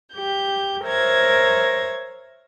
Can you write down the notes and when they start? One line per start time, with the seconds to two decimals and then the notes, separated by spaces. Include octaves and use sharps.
0.13 G4 G6
0.85 A#4 C5 C#5 E5 G#6 A#6